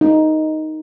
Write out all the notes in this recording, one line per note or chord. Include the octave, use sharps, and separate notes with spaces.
D#4